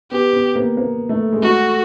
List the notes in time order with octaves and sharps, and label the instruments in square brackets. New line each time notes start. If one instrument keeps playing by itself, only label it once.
[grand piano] B3 [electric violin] G4
[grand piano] B3
A#3
A#3
A3
G#3
[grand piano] A3 [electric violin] F#4